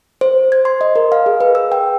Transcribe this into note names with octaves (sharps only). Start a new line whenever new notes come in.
C5
G#6
C6
D#5
A#4
F5
G#4
B4
E6
G5